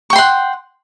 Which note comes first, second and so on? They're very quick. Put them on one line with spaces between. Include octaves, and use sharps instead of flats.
C#6 G5 C6 F#5